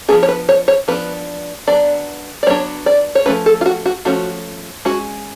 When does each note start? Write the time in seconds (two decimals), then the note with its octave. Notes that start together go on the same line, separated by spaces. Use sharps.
0.08 F3 B3 D4 G#4
0.23 C#5
0.28 B4
0.49 C#5
0.68 C#5
0.88 F3 B3 D4 B4
1.67 F#3 B3 D4 D5
2.43 D5
2.46 F#3 B3 D4 C#5
2.86 D5
3.15 C#5
3.26 F3 A3 C#4 B4
3.46 A4
3.61 F4
3.66 F#4
3.86 F#4
4.05 F3 A3 C#4 F#4
4.85 G#3 C#4 F#4